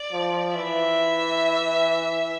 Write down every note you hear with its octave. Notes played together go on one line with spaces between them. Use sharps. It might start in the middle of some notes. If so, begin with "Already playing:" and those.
Already playing: D5
F3
E3 E5